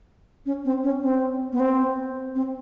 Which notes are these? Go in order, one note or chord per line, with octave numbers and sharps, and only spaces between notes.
C#4
C4
C#4
C4
B3
C4
C4